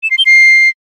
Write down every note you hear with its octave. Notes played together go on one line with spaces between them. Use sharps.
E7
C7
G7
C7